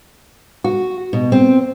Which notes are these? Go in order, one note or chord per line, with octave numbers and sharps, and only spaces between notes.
F#4
B2
C4